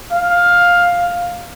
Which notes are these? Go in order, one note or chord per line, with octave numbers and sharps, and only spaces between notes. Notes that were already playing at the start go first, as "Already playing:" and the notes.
F5